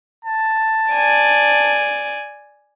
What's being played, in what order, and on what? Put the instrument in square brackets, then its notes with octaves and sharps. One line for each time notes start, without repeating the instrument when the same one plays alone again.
[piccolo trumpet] A5
[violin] D5 G#5